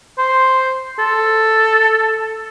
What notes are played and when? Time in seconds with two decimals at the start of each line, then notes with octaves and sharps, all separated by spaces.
0.18 C5
0.99 A4